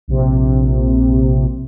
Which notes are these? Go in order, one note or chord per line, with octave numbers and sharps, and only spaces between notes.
A#1 C3